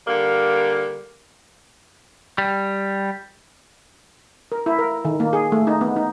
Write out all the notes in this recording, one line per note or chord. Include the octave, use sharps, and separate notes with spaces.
D3 G3 A#3
G3
A#4
E4
A#4
D#3
A#3
G#4
A3
D#4
B3
D#4